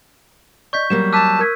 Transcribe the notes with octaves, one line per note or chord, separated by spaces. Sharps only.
D5 D#5 C#6 G6 B6
F#3 G3 A#3 E7
A5 D6 E6 F#6 B6 D#7
A#4 G#6 B6